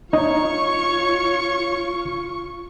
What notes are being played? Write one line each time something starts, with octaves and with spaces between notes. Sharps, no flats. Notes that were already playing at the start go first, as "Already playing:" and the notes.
D#4 F4 C#5 C#6